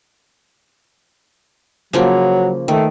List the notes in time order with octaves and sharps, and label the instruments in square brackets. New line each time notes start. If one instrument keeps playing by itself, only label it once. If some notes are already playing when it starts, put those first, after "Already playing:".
[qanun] C#3 F3 A#3 [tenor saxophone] F#3
[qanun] D#3 [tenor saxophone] A3